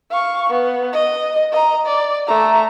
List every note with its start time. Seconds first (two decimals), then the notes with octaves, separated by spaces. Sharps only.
0.11 F5 C#6
0.50 B3
0.93 D#5
1.52 D#5 A#5
1.86 D5
2.27 A3 A#5